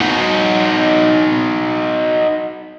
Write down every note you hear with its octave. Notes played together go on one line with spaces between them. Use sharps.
D#4 F#4